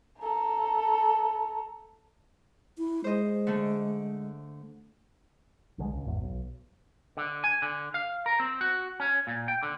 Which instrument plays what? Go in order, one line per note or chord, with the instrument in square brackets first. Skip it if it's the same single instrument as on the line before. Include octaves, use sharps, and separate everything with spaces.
[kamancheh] A4 A#5
[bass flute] E4
[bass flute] G#3 [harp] C5 D#5
[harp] D3 A3
[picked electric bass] B1 D3 F3 G#3
C#2
G#1 E2
B1
[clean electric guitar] D3
G#5
D3
F5
A#4
C4
F#4
C#4
A#2
G5
D3